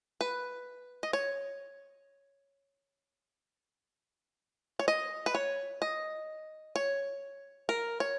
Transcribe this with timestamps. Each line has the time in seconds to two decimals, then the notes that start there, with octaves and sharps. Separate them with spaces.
0.21 B4
1.03 D#5
1.13 C#5
4.79 C#5
4.88 D#5
5.26 B4
5.35 C#5
5.82 D#5
6.76 C#5
7.69 A#4
8.00 C#5